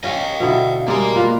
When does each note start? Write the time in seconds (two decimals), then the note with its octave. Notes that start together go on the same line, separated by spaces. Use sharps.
0.04 C#4 D#5 F5
0.40 B2 D3 E4
0.88 G3 G#3 A#3 D5 A#5
1.16 F4 B4